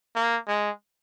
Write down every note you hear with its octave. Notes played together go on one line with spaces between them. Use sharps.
A#3
G#3